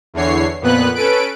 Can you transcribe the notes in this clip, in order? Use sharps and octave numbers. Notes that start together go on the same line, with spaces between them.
E2 D3 E3 C#5 C7
F2 A#2 B3 B4 F#6
C#4 A4 B4 D7